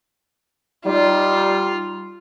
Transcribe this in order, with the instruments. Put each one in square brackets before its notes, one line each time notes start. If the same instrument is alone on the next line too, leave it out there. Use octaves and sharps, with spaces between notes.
[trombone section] G3 D#4 [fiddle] F4